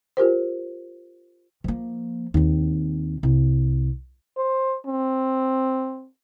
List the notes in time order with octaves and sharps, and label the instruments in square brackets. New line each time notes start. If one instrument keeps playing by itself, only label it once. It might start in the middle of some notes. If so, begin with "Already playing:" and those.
[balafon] F4 G4 A#4 C5
[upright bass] F3 A#3
D#2 C4
C2
[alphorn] C5
C4